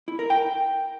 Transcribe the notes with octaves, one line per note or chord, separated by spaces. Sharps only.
E4
A#4
G5